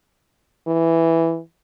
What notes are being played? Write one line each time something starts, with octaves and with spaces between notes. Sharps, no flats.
E3